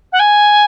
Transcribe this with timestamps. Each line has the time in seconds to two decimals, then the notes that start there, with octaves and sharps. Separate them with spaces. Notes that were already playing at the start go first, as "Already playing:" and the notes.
0.12 F#5
0.19 G#5